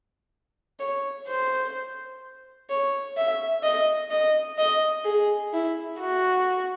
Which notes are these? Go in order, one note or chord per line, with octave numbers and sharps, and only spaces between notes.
C#5
C5
C#5
E5
D#5
D#5
D#5
G#4
E4
F#4